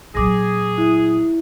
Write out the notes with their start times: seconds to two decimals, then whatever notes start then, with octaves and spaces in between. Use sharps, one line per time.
0.15 A#2 F#3 G#4 D6 A#6
0.78 E4